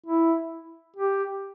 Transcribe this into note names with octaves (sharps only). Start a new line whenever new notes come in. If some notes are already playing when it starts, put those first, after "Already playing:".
E4
G4